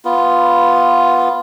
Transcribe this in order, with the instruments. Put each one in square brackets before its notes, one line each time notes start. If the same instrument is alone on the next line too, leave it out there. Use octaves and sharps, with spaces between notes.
[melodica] B3 F4